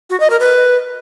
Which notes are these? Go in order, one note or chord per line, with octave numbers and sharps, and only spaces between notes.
F#4
D#5
A#4
B4